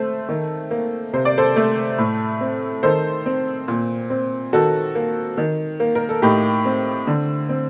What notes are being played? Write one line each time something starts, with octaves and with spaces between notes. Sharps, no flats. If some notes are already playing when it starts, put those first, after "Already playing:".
Already playing: A3 C4 C5
D#3
A#3
C3 C5
D5
A4 C5
A3
A2
C4
D#3 A4 C5
C4
A#2
C4
D#3 F#4 A4
A#3
D#3
A#3
A#4
A4
A2 D#4 G4
C4
D3
C4